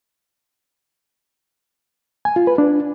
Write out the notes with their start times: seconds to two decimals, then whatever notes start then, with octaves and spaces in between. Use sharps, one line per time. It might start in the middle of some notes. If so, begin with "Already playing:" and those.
2.25 G#5
2.36 F4
2.47 B4
2.58 D4